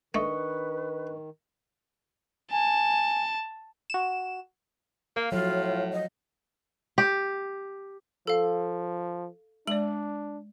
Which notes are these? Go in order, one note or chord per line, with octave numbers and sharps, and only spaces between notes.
D#3 A3 D4 B4 D#5 C#6
G#5 A5
F#4 E7
A#3 F5
A2 F3 F#3 F4
D#5
G4
F3 A4 F5
G#3 D4 D5 F#7